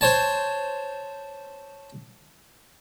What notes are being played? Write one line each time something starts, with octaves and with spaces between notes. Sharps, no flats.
C5 C#5 A5